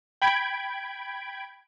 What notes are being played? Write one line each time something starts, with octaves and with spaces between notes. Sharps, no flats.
G5 B5 G#6 D7